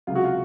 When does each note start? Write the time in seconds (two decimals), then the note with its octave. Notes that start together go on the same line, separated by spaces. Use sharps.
0.07 C#2 C3 F#3 F4
0.15 F#4
0.24 F4